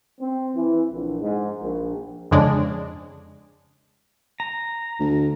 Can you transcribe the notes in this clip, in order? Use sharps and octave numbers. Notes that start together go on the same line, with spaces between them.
C4
E3
A#1
G#2
A#1
F2 C#3 G#3 D4
A#5
D2